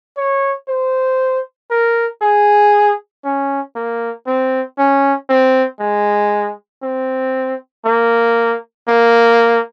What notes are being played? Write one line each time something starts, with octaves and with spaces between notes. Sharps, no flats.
C#5
C5
A#4
G#4
C#4
A#3
C4
C#4
C4
G#3
C4
A#3
A#3